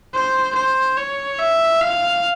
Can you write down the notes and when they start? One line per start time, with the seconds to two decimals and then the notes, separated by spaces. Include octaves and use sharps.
0.14 C5
0.55 C5
0.97 C#5
1.39 E5
1.81 F5